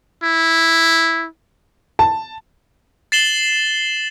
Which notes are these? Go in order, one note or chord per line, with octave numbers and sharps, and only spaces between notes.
E4
A5
A6 C7 E7 F#7 G7